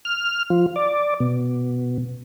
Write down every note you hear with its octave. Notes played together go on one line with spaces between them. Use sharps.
F6
F3
D5
B2